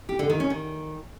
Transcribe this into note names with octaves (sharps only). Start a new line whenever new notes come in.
G4
D3
D#3
C#4
D#3